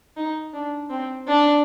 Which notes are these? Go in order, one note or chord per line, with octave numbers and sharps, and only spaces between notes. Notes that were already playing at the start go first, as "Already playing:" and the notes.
D#4
D4
C4
D4